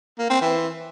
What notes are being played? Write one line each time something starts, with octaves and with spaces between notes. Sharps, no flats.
A#3
C4
E3